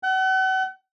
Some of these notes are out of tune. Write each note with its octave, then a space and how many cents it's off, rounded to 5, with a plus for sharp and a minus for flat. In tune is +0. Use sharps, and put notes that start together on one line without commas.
F#5 +40